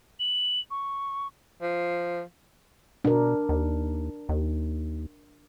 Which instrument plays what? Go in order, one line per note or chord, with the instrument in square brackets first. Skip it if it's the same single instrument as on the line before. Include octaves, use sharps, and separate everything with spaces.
[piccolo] F#7
C#6
[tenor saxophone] F3
[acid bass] B2 [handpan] D4 A#4
[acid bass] D#2
D#2